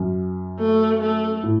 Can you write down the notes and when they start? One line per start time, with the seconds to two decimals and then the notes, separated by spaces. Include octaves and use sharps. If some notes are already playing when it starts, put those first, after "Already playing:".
Already playing: F#2
0.59 A3
1.00 A3
1.43 A2